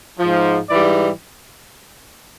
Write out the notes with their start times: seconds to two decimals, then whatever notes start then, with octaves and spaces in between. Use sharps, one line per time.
0.18 F3
0.23 G#2
0.69 G#2 E3 G3 D5